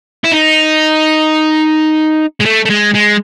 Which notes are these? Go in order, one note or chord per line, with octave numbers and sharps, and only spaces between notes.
E4
D#4
G#3
A3
A3
G#3
G#3